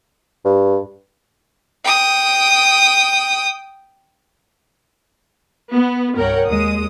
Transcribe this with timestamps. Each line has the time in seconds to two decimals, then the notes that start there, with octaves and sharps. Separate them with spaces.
0.45 G2
1.85 G5 D#6
5.71 B3
6.15 C2 G2 A#4 C#5 F#5 G5
6.46 D#2 G#3 D#6